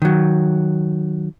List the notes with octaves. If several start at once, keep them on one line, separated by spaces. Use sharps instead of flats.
D#3 F#3